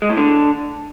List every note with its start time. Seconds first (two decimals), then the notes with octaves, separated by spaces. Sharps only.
0.02 G#3
0.10 A2
0.17 D3